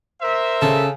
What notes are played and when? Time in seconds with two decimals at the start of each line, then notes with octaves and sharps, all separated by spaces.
0.22 A#4 C5 E5
0.62 C#3 A4